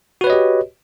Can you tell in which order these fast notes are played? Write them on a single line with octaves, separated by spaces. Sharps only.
F#4 B4 C#5 D#5 G4